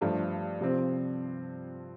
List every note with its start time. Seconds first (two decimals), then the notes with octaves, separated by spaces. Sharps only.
0.01 G2 F3 A3 D4
0.60 C3 F3 C4